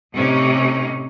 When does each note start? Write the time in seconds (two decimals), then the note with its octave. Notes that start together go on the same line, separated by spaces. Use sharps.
0.13 A2 C3 C#4 D#4